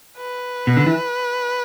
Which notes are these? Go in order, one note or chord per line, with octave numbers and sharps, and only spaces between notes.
B4
B2
D3
E3